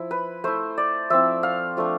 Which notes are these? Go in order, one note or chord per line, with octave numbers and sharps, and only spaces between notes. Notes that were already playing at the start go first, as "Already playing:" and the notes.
Already playing: F3 E4
B4
A3 E4 C5
D5
F3 C4 E4 E5
F5
F3 A3 D4